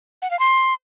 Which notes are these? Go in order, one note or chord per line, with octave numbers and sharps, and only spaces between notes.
F#5
F5
C6